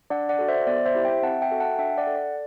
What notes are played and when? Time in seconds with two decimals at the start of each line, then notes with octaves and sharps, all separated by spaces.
0.10 D4 D5 F#5
0.29 D5 F#5
0.39 F#4 A4
0.49 C5 E5
0.67 B3 D5
0.86 C5 E5
0.95 E4 G4
1.04 E5 G5
1.22 C4 F#5 A5
1.42 E5 G5
1.51 F#4 A4
1.60 F#5 A5
1.79 D4 E5 G5
1.98 D5 F#5
2.07 A4
2.16 D5